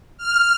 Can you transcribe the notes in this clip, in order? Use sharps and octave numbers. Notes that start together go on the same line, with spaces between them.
F6